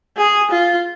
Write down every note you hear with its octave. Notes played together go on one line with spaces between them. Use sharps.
G#4
F4